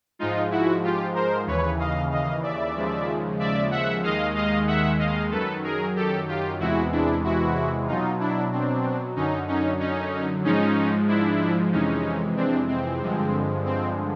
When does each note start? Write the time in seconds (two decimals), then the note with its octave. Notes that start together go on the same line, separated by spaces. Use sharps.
0.19 G#2 F3 G#3 D#4 F4
0.51 E4 F#4
0.84 F4 G4
1.15 A#4 C5
1.47 D#2 C#3 E3 B4 C#5
1.79 D#5 F5
2.12 D#5 F5
2.43 D5 E5
2.76 D#2 C#3 F3 G#3
3.39 D5 E5
3.71 E5 F#5
4.03 D#2 D#3 G#3 D#5 F5
4.35 D#5 F5
4.67 E5 F#5
4.99 D#5 F5
5.31 F#2 D#3 F#3 A4 B4
5.64 G#4 A#4
5.96 G4 A4
6.28 F4 G4
6.60 E2 C3 E3 G#3 E4 F#4
6.92 D4 E4
7.24 E4 F#4
7.87 B2 F#3 D#4 F4
8.20 D4 E4
8.52 C4 D4
9.16 F#2 D3 F#3 C#4 D#4
9.48 C#4 D#4
9.79 C#4 D#4
10.44 G#2 F3 G#3 C#4 D#4
11.08 D4 E4
11.72 F2 C3 E3 G#3 C#4 D#4
12.36 C4 D4
12.68 C4
13.00 G2 D3 F3 G#3
13.65 C4